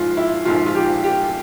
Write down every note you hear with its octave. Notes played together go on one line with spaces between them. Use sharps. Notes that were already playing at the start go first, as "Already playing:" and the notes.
Already playing: A#1 G#2 F3 F4
E4
A#1 G#2 F3 F4
F4
G4
G4